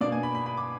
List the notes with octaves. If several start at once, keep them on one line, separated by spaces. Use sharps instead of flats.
B2 A#3 D4 D5
G#5
B5
B5
B5
D6